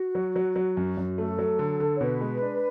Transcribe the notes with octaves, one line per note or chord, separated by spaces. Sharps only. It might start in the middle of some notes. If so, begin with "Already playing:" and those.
Already playing: F#4
F#3
F#3
F#3
F#2
F#2
A3 A4
F#3
D3
D3
C#5
B2 B4
G#3
D4